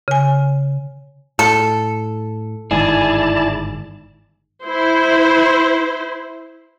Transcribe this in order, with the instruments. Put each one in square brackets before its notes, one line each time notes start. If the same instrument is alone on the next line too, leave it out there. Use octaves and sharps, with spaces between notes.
[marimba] C#3 G#5
[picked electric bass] A2 [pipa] A4
[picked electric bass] G1 G#2 D#3 [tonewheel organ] E4 D5 A5 [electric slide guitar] G#4
[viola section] E4 C5